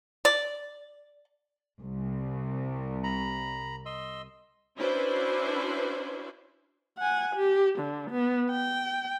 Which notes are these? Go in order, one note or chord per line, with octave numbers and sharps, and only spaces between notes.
D5
C2
A#5 B5
D#5 C6 E6
C#4 D4 E4 F#4 B4 C5
F#5 G#5
G4
D3
B3
G5